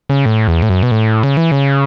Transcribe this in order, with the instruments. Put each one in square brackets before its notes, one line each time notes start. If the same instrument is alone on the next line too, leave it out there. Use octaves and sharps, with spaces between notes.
[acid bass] C#3
A2
E2
A2
F#2
B2
A2
C#3
E3
C#3